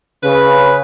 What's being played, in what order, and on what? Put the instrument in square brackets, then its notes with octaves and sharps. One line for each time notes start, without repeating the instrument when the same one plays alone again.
[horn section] C#3 B4